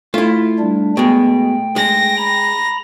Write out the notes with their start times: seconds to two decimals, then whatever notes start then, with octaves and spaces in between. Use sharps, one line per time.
0.14 A3 E4 F4
0.59 G3 D4
0.97 B2 G#3 G5
1.76 G#3 A#6
2.17 A#5 B5